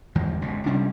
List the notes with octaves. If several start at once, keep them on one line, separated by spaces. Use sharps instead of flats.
G1 E2 D#3 G#3
G1 C#2 B2
C3 G3 C#4 D4